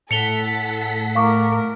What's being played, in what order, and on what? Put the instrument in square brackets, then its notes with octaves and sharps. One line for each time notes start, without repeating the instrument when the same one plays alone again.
[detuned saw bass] A2 [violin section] A4 F#5 B6 [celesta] C#7 F7 G7
[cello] A3 A#4 [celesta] F5 C#6 D6